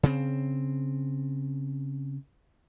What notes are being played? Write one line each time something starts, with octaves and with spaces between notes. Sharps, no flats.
C#3 C4